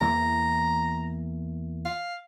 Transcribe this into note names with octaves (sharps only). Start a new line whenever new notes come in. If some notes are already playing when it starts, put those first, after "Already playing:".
E2 E3 A#3 A#5
F5